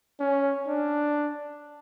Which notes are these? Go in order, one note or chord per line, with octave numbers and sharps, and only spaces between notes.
C#4
D4